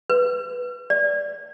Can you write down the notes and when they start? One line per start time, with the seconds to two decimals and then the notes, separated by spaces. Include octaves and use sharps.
0.10 B4
0.90 D5